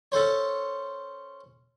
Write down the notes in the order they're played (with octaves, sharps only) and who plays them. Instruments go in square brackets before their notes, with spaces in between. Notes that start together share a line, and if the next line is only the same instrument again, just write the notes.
[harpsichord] C#4 A4 C5 C#5